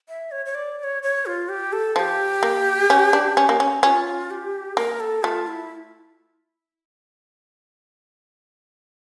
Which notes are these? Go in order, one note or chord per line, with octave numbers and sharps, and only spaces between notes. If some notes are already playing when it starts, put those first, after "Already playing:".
E5
C#5
C#5
D5
D5
C#5
C#5
F4
G4
A4
F3 G4 A4
A#3
C#4
D4
C#4
A#3
C#4
C#4 F4 G4
G4
A#3 A#4
A4
A3 F4
E4